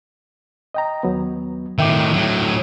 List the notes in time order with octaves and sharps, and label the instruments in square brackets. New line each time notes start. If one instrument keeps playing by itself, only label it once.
[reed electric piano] D#5 G5 A#5
D#2 F#3 B3
[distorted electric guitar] A2 D#3 [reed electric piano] E5 G5 D6
[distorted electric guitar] A2 F#3